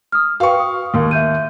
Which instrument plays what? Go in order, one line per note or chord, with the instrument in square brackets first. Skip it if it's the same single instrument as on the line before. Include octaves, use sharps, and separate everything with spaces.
[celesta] D#6 F6
[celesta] F#4 B4 G5 [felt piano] F5 C#6
[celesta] D#6
[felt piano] D#2 A#3
[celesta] E5 G6 D#7